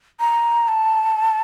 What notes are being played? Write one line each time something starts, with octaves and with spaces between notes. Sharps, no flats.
A#5
A5